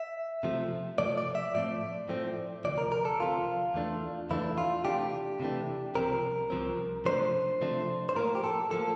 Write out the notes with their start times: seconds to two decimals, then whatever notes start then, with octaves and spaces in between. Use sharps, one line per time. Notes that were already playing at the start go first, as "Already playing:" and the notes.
Already playing: E5
0.43 C3 F3 A3
0.98 C3 F3 A3 D5
1.18 D5
1.35 E5
1.54 A2 F3 A3 C4 D5
2.09 A2 F3 A3 C4
2.64 D2 C3 F3 D5
2.78 A#4
2.92 A#4
3.05 A4
3.20 D2 C3 F3 F4
3.74 E2 E3 A3 D4
4.30 E2 E3 A3 D4 E4
4.58 F4
4.85 C3 E3 A3 D4 G4
5.40 C3 E3 A3 D4
5.95 C2 C3 F3 C4 A#4
6.50 C2 C3 F3 C4
7.05 C3 F3 A3 D4 C5
7.61 C3 F3 A3 D4
8.09 C5
8.16 A2 F3 A#3 A#4
8.35 G4
8.44 A4
8.71 A2 F3 A#3 A4